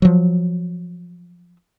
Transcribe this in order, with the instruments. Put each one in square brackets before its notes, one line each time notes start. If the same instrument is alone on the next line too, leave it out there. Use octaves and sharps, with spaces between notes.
[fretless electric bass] F3 F#3